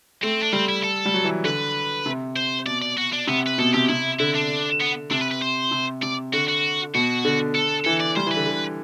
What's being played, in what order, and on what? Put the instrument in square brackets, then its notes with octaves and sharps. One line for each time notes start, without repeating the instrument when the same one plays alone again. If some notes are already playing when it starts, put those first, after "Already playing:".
[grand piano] A3 [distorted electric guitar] C4
[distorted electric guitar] D4
[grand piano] G3 [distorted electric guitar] C4
[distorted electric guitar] E4
A4
[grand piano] G3
F#3
E3
[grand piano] D3 [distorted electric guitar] B4
[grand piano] C3
[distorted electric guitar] C5
[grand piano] B2 [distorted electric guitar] D5
[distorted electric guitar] D5
F#4
D4
[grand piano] C3 [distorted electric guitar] B3
[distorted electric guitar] B4
[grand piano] B2 [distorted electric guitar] A4
[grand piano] C3 [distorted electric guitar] G4
[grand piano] C3 [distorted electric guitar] E4
[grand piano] D3 [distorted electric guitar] E4
[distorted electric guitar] D4
B3
[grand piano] C3 [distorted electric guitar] D4
[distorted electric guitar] B4
B4
C5
[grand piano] C3
[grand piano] C3 [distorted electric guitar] D5
[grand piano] D3 [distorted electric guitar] F#4
[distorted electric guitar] F#4
[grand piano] B2 [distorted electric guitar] F#4
[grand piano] D3
[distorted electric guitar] A4
[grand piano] E3 [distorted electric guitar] A4
[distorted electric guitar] D5
[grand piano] G3 [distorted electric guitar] C5
[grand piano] E3
[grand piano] D3 [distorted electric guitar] B4
[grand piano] D3